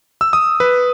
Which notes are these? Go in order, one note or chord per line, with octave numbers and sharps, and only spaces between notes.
E6
D#6
B4